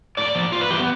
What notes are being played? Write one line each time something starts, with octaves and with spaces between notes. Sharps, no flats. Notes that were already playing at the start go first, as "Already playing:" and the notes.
A2 D5
F3
A2 F4
B4
E3 G3 G4
B3